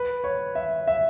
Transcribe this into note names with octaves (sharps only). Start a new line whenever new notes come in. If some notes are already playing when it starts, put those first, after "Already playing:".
Already playing: B4
C#5
E5
E5